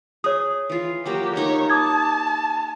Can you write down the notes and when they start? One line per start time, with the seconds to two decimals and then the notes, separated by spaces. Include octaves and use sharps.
0.24 G#4 C#5 D#6
0.70 E3 F4
1.06 F#3 A#3 F#4 G4
1.36 A#3 D#4 G4 C#5
1.70 A5 D6 D#6 G#6